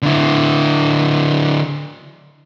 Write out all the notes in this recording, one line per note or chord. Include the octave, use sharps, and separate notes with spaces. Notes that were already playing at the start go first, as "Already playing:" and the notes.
D3 E4